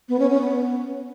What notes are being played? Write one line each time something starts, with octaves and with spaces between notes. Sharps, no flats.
B3
C#4
C#4
B3